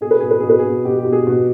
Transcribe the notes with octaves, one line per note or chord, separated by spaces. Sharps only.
B2 G#4
B4
B2 G#4
B4
B2 G#4
B4
G#4
B2
B2 G4
G4
B2
G#4
B2